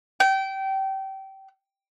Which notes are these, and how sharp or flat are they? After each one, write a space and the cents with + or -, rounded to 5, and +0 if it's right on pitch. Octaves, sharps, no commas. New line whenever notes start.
G5 -25